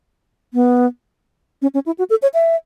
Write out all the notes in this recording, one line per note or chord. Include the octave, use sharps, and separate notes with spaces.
B3
C#4
C#4
E4
F#4
A4
C#5
E5